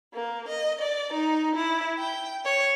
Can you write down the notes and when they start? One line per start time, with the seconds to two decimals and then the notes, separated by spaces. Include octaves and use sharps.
0.12 A#3
0.48 D#5
0.81 D5
1.12 D#4
1.54 E4
1.99 G5
2.44 C#5